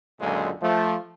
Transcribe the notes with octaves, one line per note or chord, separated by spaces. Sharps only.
C#2 F#2 A#2 D3 G#3
F3 A3